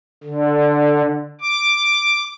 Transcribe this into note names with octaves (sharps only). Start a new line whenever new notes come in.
D3
D6